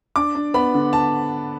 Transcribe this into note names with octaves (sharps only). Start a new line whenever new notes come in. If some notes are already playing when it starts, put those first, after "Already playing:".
D4 D6
D4
B3 B5
D3
A5